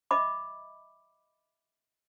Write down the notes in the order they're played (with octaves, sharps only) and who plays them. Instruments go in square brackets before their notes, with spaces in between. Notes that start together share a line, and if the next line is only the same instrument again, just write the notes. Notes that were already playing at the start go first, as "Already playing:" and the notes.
[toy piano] D#5 E5 B5 D6